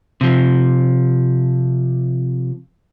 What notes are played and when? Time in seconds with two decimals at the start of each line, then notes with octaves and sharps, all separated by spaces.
0.21 C3 F3